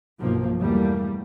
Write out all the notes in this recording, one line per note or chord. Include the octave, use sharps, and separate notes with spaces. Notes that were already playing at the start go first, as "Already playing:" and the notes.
B1 G2 F3 A#3
E2 G3 A3 A#3